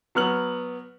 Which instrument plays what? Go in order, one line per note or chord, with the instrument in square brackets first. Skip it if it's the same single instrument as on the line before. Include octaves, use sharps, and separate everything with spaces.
[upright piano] F#3 B3 F6 F#7